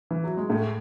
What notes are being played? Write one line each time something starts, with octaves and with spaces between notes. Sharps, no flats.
E3
F#3
G#3
A2 A3